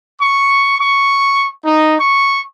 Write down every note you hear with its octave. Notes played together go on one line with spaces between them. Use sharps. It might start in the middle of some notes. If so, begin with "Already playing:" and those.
C#6
C#6
D#4
C#6